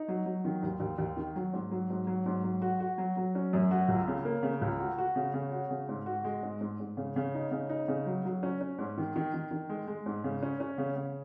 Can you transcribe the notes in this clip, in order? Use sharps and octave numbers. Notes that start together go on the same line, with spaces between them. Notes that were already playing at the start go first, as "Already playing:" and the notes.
Already playing: D#4
F#3
F#3
D#3
D#2
D#2
D#2
D#3
F#3
G#2
F#3
G#2
F#3
G#2
F#3
F#4
F#4
F#3
F#3
C#4
F#2
F#4
C#2
C#3
A#3
C#3
C#2
F#4
F#4
C#3
C#3
F#4
C#3
G#2
F#4
G#3
G#2
G#2
G#2
C#3
C#3
D#4
C#3
D#4
C#3
F#3
F#3
C#4
C#4
G#2
D#3
D#3
D#3
D#3
G#3
G#3
G#2
C#3
C#4
C#4
C#3
C#3